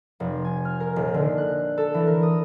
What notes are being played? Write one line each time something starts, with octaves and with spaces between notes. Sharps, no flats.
F1
G#5
F6
A#4
D#1
D3
F#6
A4
E3
A#4
D#6